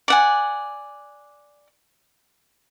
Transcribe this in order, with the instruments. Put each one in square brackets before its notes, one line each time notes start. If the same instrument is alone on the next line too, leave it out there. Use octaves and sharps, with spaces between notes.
[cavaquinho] D5 F#5 G#5